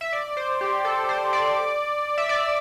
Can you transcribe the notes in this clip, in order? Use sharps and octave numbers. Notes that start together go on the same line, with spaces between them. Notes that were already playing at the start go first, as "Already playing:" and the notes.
E5
D5
C5
G4
A4
C5
D5
E5
D5